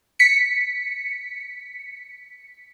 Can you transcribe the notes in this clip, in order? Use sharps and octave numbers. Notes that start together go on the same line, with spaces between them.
B6 C#7